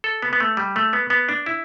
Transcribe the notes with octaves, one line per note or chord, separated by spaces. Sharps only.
A4
B3
B3
A3
G3
A3
B3
B3
D4
E4